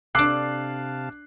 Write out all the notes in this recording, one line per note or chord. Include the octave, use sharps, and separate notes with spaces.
C3 D4 A4 F5 A5 D6 F#6 C7